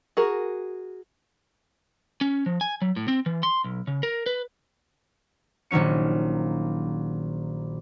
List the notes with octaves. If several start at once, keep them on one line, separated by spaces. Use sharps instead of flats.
F#4 G#4 A#4
C#4
F3
G#5
F#3
A2
C4
E3
C6
B1
C#3
A#4
B4
A#1 D#3 F#3 C#4 C#7